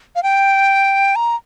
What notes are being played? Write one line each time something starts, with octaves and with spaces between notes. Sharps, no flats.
F5
G5
A#5